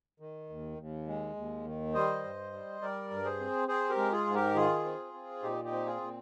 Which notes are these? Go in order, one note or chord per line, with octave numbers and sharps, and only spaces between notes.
D#3
D#2
D#2
G#3
D#2
D#3
G3 C5 D#5
G2
G3
G3 A#4 D5
G2
G#4 C5
C4
C4 G#4 C5
G4 A#4
G#3
F4 G#4
G#2
G4 A#4
D#3 F4 G#4
C4
C4
A#2 D#4 G4
D#4 G4
C4
F4 G#4
A#2